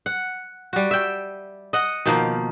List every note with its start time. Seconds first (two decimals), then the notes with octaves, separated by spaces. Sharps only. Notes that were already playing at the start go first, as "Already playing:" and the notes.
0.06 F#5
0.73 G3 F#4
0.91 E5 G5
1.73 D#5 F#5
2.06 B2 D#3 F3 A#3